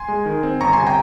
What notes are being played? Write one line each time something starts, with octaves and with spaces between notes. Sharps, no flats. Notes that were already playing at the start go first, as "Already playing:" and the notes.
Already playing: G#5 C6
G#3
D#3
C4
G1 A#5 C#6
C3 G#5 C6
G5 A#5